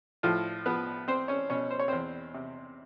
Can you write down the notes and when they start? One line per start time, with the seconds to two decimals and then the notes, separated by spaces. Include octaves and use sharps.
0.23 A2 F3 F4
0.66 F3 B3 B4
1.08 C4 C5
1.28 C#4 C#5
1.50 B2 C#4 C#5
1.70 C5
1.79 C#5
1.88 E2 C4 C5
2.34 C3